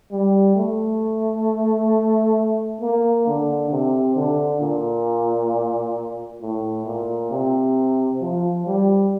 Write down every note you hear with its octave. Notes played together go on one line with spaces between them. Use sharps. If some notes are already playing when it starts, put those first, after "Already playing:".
G3
A3
A#3
D3
C3
D3
A#2
A2
A#2
C3
F3
G3